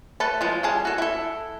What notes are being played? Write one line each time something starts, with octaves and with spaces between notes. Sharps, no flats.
A3 A4 B4 A5
F3 G#3
G3 G#4 A5
F#4 A4
E4 A4